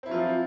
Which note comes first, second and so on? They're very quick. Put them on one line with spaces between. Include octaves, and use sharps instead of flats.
C4 E4 F#3 F4 F3